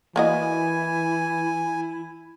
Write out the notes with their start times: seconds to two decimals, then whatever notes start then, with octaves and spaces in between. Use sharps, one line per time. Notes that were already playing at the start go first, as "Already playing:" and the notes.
0.16 E3 A#3 E4 F#4 D#5 G#5